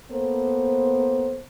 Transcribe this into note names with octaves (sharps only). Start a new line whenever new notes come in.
A#3 B3 A4 C5